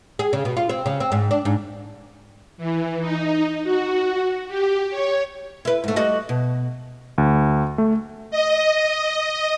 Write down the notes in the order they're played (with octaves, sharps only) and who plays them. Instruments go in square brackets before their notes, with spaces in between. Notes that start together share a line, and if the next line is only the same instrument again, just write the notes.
[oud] G#4
C#3
B2
F4
C4
C#3
C4
G#2
D4
G#2
[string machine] E3
D#4
F#4
G4
C#5
[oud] E4 B4
G#2 A3
G3 F#4 D#5
B2
[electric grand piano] D2
A3
[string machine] D#5